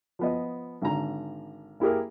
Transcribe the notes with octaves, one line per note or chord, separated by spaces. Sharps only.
F3 B3 D#5
G#1 D3 A#5
A#3 E4 G4 G#4 A#4